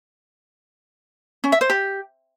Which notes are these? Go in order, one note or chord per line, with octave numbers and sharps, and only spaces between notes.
C#4
E5
C5
G4